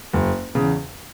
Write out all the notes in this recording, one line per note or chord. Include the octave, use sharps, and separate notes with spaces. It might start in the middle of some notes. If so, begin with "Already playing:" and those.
F#1
E2 C#3